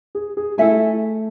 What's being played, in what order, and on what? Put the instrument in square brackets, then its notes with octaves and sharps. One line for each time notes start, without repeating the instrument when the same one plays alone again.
[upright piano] G#4
G#4
[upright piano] A3 [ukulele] E4 A4 E5 G#5